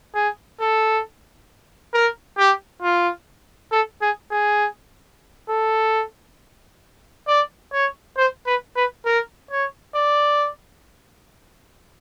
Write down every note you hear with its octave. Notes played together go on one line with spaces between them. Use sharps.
G#4
A4
A#4
G4
F4
A4
G#4
G#4
A4
D5
C#5
C5
B4
B4
A#4
C#5
D5